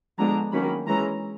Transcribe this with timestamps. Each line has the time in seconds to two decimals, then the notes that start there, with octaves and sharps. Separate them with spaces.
0.18 D3 F3 G#3 B3 D4 A#5
0.52 D#3 F#3 A#3 C#4 B5
0.87 E3 G#3 C#4 A#5